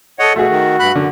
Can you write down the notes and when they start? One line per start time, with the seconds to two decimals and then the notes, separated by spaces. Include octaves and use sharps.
0.19 A4 C#5 D#5 F#5
0.36 B2 A3 F#4 G#4
0.49 D#3
0.80 G2 B5 F#6
0.95 F#2 D3